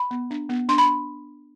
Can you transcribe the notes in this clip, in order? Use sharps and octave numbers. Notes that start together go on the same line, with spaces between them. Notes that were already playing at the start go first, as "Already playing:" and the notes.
Already playing: B5
B3
D4
B3
D4 C6
B5